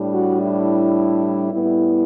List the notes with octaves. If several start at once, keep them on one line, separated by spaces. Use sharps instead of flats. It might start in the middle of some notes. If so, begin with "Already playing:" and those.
Already playing: A2 G3 D4
F#4
E4
A2 G3 B3 E4